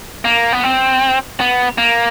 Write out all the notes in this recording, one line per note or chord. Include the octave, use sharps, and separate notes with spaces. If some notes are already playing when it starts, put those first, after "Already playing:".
A#3
B3
C4
B3
A#3